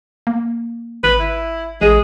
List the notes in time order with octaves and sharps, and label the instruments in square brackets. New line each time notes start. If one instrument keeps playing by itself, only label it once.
[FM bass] A#3
[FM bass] G#1 [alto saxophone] B4
[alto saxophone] E4
[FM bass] A1 [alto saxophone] G#3 [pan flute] G#4